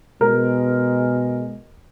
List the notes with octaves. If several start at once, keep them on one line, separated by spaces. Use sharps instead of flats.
B2 G#3 A#4